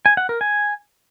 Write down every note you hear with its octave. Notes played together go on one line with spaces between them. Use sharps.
G#5
F#5
A#4
G#5